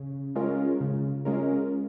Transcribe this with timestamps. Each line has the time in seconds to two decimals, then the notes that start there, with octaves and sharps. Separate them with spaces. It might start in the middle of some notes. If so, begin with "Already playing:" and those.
Already playing: C#3
0.36 G#3 C#4 F4 A#4
0.81 C#3
1.25 G#3 C#4 F4 A#4